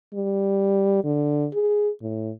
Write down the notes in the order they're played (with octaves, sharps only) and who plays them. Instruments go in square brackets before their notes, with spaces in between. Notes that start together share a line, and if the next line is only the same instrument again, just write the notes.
[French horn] G3
D3
G#4
A2